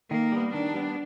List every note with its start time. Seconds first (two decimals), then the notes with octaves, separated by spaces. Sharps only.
0.11 D#3 A#3
0.32 G3 B3
0.53 D#3 D4
0.74 G3 B3